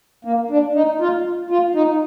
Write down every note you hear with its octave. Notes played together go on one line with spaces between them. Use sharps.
A#3
D4
D#4
F4
F4
D#4